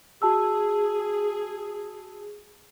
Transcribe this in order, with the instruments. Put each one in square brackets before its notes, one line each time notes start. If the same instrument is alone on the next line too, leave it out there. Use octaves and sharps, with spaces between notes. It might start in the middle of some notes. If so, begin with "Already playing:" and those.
[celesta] F#4 A5 E6 [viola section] G#4